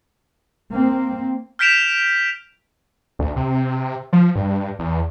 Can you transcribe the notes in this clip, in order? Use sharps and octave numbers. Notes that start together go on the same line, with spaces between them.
A#3 C4
F6 G6 B6 D7 E7 F7
D2
C3
F3
G2
E2